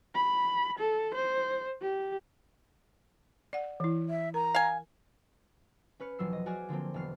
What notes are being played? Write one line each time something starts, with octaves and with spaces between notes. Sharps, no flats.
B5
A4
C5
G4
D5 F#5
E3 E4
E5
A#4 A#5
F5 G#5
C#4 B4 F6 C#7
E1 F3 F#3 E6 C7
D#5
F#4 G#4 D5 G#5 D6 F6
D3 F3 A#3 C4
E1 B3 F6 C7